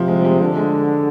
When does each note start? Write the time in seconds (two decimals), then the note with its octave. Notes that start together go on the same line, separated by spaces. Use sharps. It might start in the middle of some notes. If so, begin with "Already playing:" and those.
Already playing: C3 F3
0.08 G#3
0.21 G3
0.25 G#3
0.41 D3
0.57 G#3